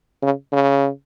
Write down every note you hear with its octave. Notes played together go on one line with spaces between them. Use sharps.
C#3
C#3